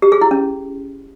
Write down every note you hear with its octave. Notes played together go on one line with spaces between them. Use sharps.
G4
G#4
E4
C#4